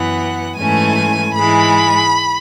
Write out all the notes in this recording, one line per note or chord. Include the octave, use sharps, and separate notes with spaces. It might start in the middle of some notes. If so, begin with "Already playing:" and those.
Already playing: F#2 E3 B3 F#5
G#2 E3 A3 C#4 G#5
G#2 E3 G#3 B5